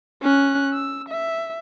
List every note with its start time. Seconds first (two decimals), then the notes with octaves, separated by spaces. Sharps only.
0.22 C#4 F#6
0.74 E6
1.09 E5